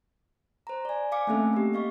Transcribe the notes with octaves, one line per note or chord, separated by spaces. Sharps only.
C5 A#5
D5 G#5
F5 G#5 D6 C#7
A3 A#3 C4 C#4 A4 E5
A#3 G4
D#5 F5 C#6